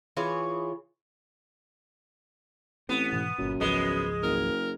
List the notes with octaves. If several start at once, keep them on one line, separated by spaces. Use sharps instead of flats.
E3 F4 G#4 C#5
A1 B3 C4
G#2 B2 E3
G1 F#2 A#2
G#1 C#2 F3 G#3 B3
F#1 A#4